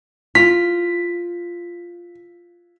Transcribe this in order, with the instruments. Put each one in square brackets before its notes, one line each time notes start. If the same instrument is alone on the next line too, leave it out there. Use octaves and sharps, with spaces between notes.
[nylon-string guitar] F4 [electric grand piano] B6